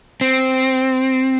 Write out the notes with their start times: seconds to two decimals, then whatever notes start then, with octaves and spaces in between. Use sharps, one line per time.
0.21 C4